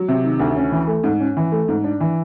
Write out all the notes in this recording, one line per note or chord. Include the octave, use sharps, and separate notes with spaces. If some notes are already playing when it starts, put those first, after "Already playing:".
Already playing: F#3
C3
D#3
D2
C#4
E3
A3
G#2
C#4
E3
A3
G#2
D4
E3